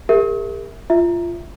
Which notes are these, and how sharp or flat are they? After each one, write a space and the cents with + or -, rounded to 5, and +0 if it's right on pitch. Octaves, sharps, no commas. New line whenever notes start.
G4 +45 A#4 -25 E5 +0
F4 -20 E5 +0